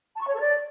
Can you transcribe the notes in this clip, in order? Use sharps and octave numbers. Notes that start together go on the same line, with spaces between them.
A5
C#6
C#5
A4
D5